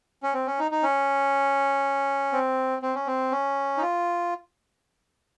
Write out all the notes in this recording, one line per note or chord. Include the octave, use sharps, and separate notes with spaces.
C#4
C4
C#4
D#4
D#4
C#4
C4
C4
C#4
C4
C#4
D#4
F4